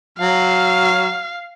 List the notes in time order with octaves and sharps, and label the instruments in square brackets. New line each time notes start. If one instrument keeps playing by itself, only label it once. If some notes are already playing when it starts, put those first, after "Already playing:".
[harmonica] F#3 [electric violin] F5